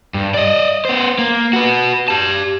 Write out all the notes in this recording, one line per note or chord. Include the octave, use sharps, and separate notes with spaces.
G2
D5 D#5
B3 C5
A#3
F#4 B4
G4 A5